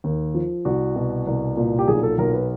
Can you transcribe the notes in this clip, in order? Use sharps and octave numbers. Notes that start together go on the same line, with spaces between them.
D#2
F3
C2 F#4
B2
C2
A#2
G4
B1 G#4
A4
B1 A#4
B4